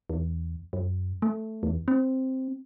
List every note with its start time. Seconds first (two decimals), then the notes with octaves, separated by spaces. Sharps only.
0.10 E2
0.73 F#2
1.22 A3
1.63 E2
1.88 C4